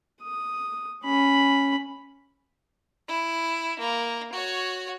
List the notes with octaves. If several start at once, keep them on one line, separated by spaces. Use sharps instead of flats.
D#6
C#4 B5
E4
A#3
F#4 C#5